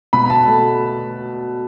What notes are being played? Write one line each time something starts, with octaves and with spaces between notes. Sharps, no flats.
B2 B5
A5
A3